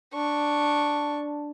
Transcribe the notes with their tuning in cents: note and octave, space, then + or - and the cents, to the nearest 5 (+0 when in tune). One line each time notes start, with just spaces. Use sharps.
D4 +0 C#6 +0